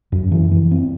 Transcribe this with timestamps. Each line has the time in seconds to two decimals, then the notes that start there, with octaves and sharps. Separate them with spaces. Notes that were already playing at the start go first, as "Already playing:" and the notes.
0.12 F#2
0.32 E3
0.52 E3
0.71 C4